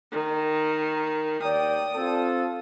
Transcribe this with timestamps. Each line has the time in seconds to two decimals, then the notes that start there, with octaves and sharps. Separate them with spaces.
0.11 D#3
1.42 D#2 D5 G5 D#6
1.95 C4 F4 A4